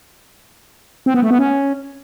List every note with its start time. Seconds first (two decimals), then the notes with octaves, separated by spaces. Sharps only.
1.06 C4
1.14 B3
1.22 A3
1.31 B3
1.39 C#4